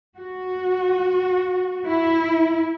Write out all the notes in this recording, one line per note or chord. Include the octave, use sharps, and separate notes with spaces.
F#4
E4